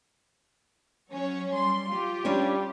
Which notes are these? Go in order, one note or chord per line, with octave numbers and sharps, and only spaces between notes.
F#3 C#4 C#5
G3 C6
F4 G4
G3 C#4 D4 C#5